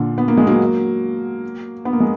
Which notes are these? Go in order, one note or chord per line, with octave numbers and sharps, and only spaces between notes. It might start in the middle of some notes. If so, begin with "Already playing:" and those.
Already playing: A#2 D3
B3
A#3
G#3
F#3 A#3
B3
A#3
G#3